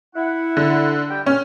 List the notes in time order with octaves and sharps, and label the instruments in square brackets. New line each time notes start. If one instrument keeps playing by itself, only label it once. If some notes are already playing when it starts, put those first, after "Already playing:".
[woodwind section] E4 F#5
[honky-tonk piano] D3
[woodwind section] G3 G5
[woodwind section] C#2 A#2 F6 [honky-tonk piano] C#4